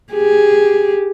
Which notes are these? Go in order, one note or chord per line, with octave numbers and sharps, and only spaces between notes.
G4 G#4